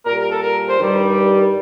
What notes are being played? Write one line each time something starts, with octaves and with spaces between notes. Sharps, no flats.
A#2 G3 A#4
A#4
A4
A#4
C5
G2 D#3 G3